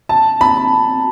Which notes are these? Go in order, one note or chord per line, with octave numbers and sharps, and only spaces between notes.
A5
B5